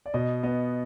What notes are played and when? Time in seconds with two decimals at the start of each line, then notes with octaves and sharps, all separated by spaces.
0.06 D5
0.14 B2 D#5
0.43 B3 D#5